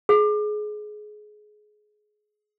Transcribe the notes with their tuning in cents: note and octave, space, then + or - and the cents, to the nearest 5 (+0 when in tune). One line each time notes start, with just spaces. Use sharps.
G#4 +25